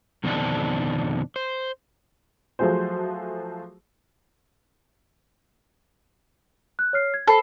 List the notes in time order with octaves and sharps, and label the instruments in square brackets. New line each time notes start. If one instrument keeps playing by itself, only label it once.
[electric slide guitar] F2 B2 D3 D#3 C4 D4
C5
[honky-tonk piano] F3 F#3 A3 F#4 G#4 C5
[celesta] F#6
C#5 F6 C7
G#6
[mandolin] A4 [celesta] C5 B5 C7